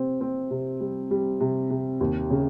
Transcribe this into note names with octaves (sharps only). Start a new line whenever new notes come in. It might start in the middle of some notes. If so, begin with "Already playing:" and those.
Already playing: C3 C4
C4
C3
G3
G3
C3
C3
D#2
C#3